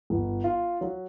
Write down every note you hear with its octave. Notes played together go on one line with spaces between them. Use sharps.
G1
F4
F#3